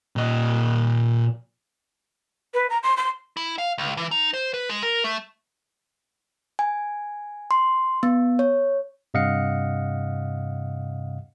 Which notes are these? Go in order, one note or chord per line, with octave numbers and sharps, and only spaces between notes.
A#2 D#5
B4
A#5
C6
C6
E4
F5
C#2
E3
D#4
C5
B4
G#3
A#4
A3
G#5
C6
B3
C#5
G2 C3 D#5 F5 F#5 C#7